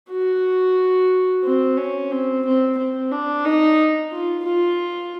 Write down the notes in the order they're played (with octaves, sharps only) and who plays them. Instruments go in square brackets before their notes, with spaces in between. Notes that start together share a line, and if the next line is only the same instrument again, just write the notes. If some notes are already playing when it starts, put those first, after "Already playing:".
[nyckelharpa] F#4
C4
C#4
C4
C4
C4
D4
D#4
F4
F4